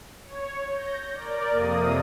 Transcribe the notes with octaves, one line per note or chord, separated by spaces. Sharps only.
C#5
G6 A#6
A#4 D5
F2 C3 A#3 D#6